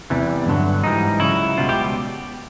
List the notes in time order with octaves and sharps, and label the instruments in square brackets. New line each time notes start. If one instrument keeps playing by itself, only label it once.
[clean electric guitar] E2 C3 E3 G3
G2 D3 F#3
G#2 E3 G3 D#4
C#2 C#3 F#3 E4
C#2 B2 G3 F4
G4